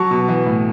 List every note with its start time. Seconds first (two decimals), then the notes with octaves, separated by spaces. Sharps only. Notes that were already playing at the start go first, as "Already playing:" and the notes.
Already playing: F#3 A5 C#6
0.11 B2
0.28 E3
0.46 A2